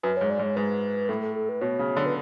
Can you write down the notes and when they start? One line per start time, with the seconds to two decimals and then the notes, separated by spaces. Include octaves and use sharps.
0.03 F#2 B4
0.17 G#2 C#5
0.30 D5
0.39 G#2
0.43 C#5
0.56 G#2 B4
1.09 A2 A4
1.22 A4
1.35 A4
1.49 B4
1.61 B2 C#5
1.79 C#3
1.97 D3
2.06 B4